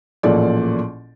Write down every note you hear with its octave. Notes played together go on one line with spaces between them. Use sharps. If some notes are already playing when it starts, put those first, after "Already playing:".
A1 A#2 F3 G#4 A4 D5